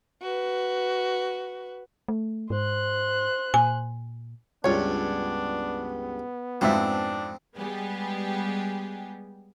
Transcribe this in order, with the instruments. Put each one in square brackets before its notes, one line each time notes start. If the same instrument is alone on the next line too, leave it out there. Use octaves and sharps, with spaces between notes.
[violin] F#4 B4
[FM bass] A3
[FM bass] G#2 [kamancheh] C5 F#6
[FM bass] A#2 [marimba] G#5
[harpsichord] C#2 G2 [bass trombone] B3 [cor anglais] D4 [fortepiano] F4 C#5
[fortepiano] F2 G#2 E5 [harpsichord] C4 [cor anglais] D4
[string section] G3 G#3 B3 G4 G#4